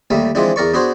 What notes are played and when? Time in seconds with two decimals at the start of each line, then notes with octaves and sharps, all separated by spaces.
0.10 D#2 G3 A3 A#3
0.35 E3 F3 G#3 C4 D4
0.56 E2 A#4 D5 C#6
0.74 B3 D4 F#4 G#4 C5